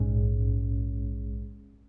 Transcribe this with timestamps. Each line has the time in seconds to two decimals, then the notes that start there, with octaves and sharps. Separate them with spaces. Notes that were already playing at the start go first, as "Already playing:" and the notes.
Already playing: A#1 G#2 G#3 C#4